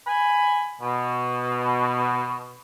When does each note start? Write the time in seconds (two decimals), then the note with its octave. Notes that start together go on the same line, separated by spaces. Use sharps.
0.07 G#5 B5
0.82 B2